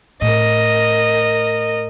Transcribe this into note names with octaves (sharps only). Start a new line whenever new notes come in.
A2 A#4 D#5